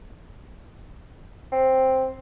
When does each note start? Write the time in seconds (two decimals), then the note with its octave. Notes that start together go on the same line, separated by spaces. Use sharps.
1.52 C4